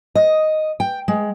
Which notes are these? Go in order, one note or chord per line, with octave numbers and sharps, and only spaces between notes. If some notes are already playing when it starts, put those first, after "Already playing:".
D#5
G5
G#3